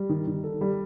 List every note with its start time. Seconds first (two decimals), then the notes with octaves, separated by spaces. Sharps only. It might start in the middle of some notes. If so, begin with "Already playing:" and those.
Already playing: G3
0.09 D#3
0.27 D#3
0.44 A4
0.61 G3